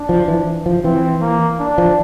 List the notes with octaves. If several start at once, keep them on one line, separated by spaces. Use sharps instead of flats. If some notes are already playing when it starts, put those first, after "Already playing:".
Already playing: D4
F3
E3
F3
E3 C4
A#3
D4
F3